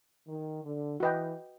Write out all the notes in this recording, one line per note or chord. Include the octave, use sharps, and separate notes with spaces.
D#3
D3
E3 F#4 B4 D#5 G5